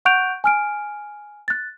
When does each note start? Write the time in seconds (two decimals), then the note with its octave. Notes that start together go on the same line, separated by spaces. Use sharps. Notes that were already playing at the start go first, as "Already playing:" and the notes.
0.05 F#5 C#6 F#6 G6 D7 F7
0.44 G#5 F6 D7
1.48 F#6 A6